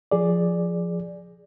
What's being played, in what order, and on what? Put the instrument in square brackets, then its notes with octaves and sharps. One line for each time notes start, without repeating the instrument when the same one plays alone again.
[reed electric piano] F3 G#4 D5